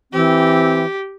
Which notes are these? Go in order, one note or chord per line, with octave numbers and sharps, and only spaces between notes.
E3 C4 G4